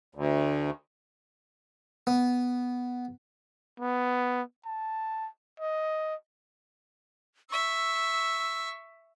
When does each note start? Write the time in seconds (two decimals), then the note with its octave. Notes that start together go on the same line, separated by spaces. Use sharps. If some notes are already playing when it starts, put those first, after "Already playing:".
0.15 D2
2.07 B3
3.80 B3
4.66 A5
5.60 D#5
7.50 E5 C#6 E6